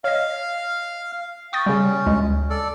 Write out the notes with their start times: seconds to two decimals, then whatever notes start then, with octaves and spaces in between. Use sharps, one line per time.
0.04 C#5 D#5 F5
1.53 G5 C#6 D#6 A6
1.66 C#3 G3 C#4
2.06 D2 G#3
2.50 A4 D5